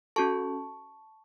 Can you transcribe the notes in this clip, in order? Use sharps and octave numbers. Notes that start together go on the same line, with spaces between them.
C#4 F#4 A4 A5 C#6